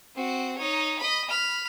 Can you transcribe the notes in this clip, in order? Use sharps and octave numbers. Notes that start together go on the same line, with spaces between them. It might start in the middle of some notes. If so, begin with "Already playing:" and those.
C4 F#4
D#4 C#5
D#5 B5
B5 F6